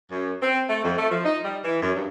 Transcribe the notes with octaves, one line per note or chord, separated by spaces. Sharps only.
F#2
C4
A3
F2
A3
F3
D#4
G3
E3
F#2
G2